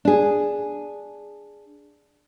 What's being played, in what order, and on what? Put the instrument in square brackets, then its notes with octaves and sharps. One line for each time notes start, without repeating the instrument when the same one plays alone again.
[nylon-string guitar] D4 G#4